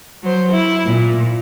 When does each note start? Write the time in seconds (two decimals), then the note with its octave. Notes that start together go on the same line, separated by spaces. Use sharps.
0.23 F#3 C5
0.52 E4
0.85 A#2